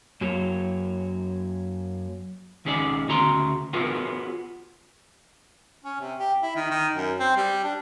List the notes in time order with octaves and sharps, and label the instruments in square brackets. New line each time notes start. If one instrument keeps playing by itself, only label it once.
[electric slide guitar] F#2 F#3 A#3 C#5
[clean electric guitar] C#2 D#3 C#4 G#4 A#4 D5
D2 C#3 F#4 A#5 C6
B3 F4 F#4 G#4 A#4 C#5
[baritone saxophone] C#4
C3
G4
E4
D#3
D#3
F#2
C4
G3
D4